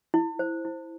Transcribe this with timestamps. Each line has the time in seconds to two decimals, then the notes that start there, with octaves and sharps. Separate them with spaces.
0.14 E4
0.39 C5
0.65 E4